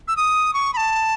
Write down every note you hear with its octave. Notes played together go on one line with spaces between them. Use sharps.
E6
D#6
C#6
B5
A5